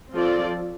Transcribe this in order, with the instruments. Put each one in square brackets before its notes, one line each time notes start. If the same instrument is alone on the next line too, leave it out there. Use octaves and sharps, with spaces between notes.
[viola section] F3 C4 F4 A4 D5